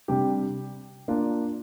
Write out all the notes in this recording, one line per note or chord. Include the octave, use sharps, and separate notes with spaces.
C3 G3 D4 G4
A#3 D4 F4